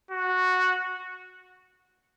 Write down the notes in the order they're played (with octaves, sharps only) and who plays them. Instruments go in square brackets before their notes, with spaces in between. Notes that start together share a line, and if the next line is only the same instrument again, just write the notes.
[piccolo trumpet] F#4